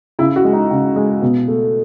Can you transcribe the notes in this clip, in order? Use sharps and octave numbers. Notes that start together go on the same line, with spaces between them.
C#3 E4
F#4
G#3
D#4
C#3
G#3
B2
A3